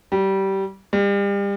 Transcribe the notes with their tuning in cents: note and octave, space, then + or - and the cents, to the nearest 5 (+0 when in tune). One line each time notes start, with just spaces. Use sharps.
G3 -20
G3 +35